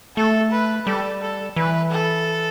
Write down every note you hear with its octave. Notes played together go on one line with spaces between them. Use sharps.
A3 A4
B4
G3 A4
A4
E3 B4
A4